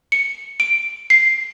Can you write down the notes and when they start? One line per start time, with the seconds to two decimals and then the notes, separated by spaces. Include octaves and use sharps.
0.12 C#7
0.60 D7
1.10 C7